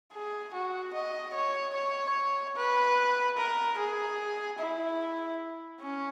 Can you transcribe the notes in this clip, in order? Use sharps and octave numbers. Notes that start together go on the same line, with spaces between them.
G#4
F#4
D#5
C#5
C#5
B4
A#4
G#4
E4
C#4